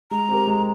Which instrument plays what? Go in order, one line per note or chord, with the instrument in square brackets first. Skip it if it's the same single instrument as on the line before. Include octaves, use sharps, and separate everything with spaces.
[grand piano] G#3 [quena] A#5
[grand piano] C4 G4 A#4
G#3